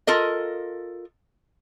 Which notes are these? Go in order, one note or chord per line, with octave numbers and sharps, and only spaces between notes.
F4 A4 A#4 D#5